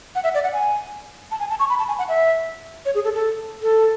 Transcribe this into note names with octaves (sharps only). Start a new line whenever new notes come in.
F#5
E5
D5
F#5
G#5
A5
G#5
A5
C#6
B5
A5
G#5
F#5
E5
C#5
G#4
A4
A4
A4